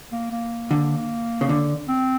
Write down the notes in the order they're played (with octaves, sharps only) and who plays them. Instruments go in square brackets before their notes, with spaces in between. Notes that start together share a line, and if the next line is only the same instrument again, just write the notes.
[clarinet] A#3
A#3
[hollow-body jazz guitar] D3
C#3
D3
[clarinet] C4